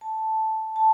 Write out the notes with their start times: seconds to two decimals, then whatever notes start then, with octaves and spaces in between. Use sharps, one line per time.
0.01 A5
0.76 A5